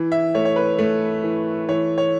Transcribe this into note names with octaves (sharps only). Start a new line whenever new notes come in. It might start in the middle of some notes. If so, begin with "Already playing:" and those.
Already playing: E3
E5
A3 C#5
C#5
B4
A3
E3
E3 C#5
C#5